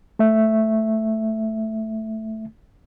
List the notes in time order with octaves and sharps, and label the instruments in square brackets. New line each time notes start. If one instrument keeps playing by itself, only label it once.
[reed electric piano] A3 E5